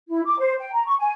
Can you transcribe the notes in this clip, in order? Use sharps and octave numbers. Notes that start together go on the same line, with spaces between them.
E4
D6
C5
G5
A#5
C#6
G#5